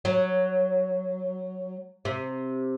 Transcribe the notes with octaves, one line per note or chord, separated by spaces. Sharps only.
F#3
C3